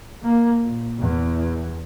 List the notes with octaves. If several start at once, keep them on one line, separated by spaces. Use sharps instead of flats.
A#3
A#2
E2